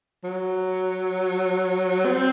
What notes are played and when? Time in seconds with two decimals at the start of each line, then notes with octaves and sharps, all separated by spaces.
0.24 F#3
2.05 C4